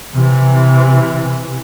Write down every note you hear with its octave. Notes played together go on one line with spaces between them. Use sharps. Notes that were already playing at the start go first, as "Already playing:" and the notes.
C3 E3